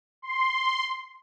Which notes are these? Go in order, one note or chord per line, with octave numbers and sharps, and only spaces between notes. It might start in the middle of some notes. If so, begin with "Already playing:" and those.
C6